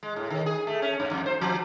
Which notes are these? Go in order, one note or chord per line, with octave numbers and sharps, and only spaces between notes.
G#3
A2
D#3
G#4
A3
C#4
G2
F2
C5
F3